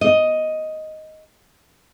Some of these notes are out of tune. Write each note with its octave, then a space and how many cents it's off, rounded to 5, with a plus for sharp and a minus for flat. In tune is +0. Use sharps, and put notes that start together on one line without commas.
D#5 +5